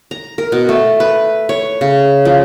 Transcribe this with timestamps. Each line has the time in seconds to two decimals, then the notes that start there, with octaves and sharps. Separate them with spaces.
0.11 A#5
0.38 A#4
0.52 B2
0.69 A3
1.00 B4
1.49 C#5
1.81 C#3
2.25 F3